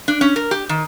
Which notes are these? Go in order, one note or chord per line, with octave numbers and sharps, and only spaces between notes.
D4
C#4
A#4
G4
D#3